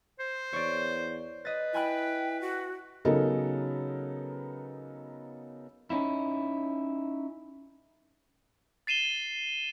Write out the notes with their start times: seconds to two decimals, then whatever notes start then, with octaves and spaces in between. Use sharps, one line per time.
0.19 C5
0.53 E2 C#5 D5
1.45 B4 D#5 A6
1.74 E4 G5 G#5 B5 F#6
2.41 F#4
3.05 C#3 F#3 B3 D#4 A4 A#4
5.90 C#4 D#4 E4
8.87 A6 C7 D#7 E7 G7